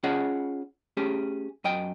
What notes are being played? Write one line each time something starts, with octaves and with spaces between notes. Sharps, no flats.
C#4 F4 G#4 C#5 D#5 F#5
A3 C#4 G4 G#4
F#2 D#5 G5